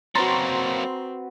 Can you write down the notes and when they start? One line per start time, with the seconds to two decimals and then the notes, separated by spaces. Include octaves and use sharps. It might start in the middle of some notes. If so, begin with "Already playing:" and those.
0.15 F#3 A#3 C4 F#4 B4 A#5 C6 A6